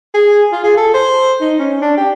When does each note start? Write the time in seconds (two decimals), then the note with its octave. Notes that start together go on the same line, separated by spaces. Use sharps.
0.14 G#4
0.52 F4
0.64 G#4
0.77 A4
0.94 C5
1.41 D#4
1.59 C#4
1.82 D4
1.97 G4